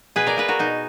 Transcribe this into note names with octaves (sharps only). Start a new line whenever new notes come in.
B2 G#4 B4
A#4 D5
A#3 G#4 B4
F#4 A#4
B2 D#4